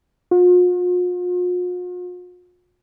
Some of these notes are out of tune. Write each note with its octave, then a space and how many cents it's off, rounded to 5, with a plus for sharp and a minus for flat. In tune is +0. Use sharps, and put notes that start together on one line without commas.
F4 +45